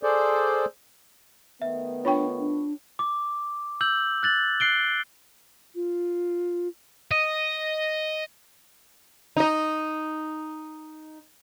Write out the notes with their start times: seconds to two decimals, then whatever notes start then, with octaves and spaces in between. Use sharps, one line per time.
0.03 G#4 A4 C5 D5
1.62 D#3 A3 B3 E5
2.05 D4 F4 C#5 G5 B5 C#6
2.39 D4
2.99 D6
3.81 E6 G6 F#7
4.23 F#6 A6 F#7
4.60 F#6 C7 D7 G7
5.75 F4
7.11 D#5
9.37 D#4 D#5